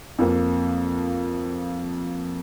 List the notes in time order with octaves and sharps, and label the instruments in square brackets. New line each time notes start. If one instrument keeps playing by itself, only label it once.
[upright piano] F2 F3 A#3